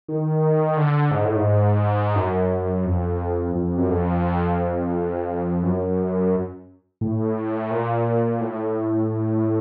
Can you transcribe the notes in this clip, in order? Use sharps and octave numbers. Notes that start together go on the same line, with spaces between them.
D#3
D3
G#2
A2
G#2
F#2
F2
F2
F#2
F2
F#2
A2
A#2
A2